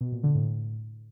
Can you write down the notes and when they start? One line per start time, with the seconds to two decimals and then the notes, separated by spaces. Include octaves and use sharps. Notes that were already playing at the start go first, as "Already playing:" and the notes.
0.01 B2
0.12 A#2
0.23 D3
0.35 A2